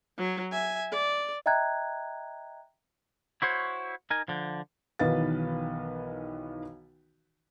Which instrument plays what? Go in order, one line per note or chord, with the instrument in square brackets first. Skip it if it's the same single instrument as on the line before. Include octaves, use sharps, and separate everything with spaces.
[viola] F#3
E5 G#5
D5
[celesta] D#5 E5 G5 A#5 F#6 G#6
[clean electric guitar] E4 F#4 C5 C#5
D#4 A#4 G#5
D3 F3
[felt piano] B1 D#3 E3 B4 F5 A6